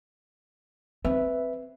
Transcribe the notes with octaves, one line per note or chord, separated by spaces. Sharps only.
C4 B4 E5